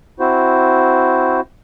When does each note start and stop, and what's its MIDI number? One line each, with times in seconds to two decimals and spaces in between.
0.20 1.41 60
0.20 1.41 64
0.20 1.41 66
0.20 1.41 72